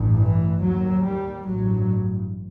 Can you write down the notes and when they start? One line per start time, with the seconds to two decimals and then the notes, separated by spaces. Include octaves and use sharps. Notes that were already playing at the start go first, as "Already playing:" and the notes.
Already playing: A1 G2
0.19 E3
0.61 D#2 F#3
1.04 G3
1.46 A1 G2 F#3